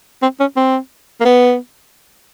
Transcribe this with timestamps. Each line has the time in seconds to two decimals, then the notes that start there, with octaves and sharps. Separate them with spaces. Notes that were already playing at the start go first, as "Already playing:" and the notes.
0.22 C4
0.40 C#4
0.56 C4
1.21 A#3
1.25 B3